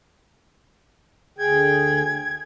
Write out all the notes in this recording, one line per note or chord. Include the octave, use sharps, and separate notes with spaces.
D2 G#4 G5 G#6